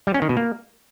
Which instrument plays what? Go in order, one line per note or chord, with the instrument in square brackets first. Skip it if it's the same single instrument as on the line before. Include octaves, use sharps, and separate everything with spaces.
[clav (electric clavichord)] G3
C#4
D#3
B2
A#3